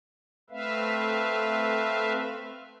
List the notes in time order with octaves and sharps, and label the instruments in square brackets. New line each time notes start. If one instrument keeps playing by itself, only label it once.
[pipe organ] A3 C4 B4 E5 F5